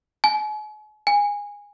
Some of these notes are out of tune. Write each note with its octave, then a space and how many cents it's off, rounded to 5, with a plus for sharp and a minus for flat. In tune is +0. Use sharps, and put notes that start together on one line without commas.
G#5 +40
G#5 -20